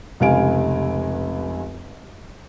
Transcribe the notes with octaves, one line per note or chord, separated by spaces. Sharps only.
F1 C#2 C3 F5 G#5 D7